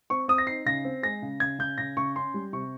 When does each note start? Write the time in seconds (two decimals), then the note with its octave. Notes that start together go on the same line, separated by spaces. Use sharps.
0.10 C4 C#6
0.28 C4 D#6
0.38 A#6
0.47 D#4 C7
0.66 C#3 A#6
0.84 C4
1.03 G#3 A#6
1.22 C#3
1.40 C#3 G#6
1.59 C#3 G6
1.78 C#3 A#6
1.97 C#3 C#6
2.16 C#4 C6
2.34 G3
2.53 C3 C#6